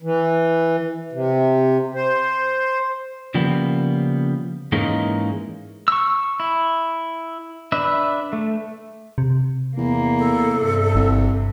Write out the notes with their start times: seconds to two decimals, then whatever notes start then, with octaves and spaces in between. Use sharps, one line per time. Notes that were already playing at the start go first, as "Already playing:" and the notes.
0.02 E3
1.12 C3
1.94 C5
3.34 C#3 F3 G3 A#3 B3
4.72 G#2 E3 G#3 A#3 C#4 D#4
5.88 C#6 E6
6.40 E4
7.72 D4 B4 E5
8.33 A3
9.18 C3
9.77 E2 A#3
10.19 A4
10.57 G2 C3
10.95 G1 C2